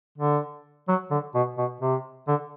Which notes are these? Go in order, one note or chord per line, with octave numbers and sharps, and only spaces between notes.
D3
F#3
D3
B2
B2
C3
D3